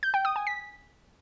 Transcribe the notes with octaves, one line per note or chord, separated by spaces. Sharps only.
G6
G5
D#6
G#5
B6